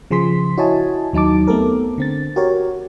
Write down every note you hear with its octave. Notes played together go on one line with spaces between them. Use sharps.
C#3 F3 G#4 C6 B6
E4 F#4 C#5 D#5 G#5 A5
D#2 F#3 D#4 A5 D6
A3 B3 C4 G4 A4 A#4
D3 C4 A6
F#4 G4 A#4 C#5